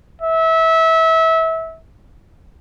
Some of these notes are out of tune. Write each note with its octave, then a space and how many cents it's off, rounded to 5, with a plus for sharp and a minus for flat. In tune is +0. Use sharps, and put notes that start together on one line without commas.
E5 -25